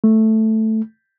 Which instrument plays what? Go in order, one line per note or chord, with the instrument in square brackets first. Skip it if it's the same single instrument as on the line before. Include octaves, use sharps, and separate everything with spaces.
[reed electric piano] A3